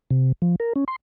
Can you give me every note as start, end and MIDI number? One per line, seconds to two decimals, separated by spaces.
0.11 0.32 48
0.42 0.56 53
0.60 0.73 70
0.76 0.84 61
0.88 0.96 84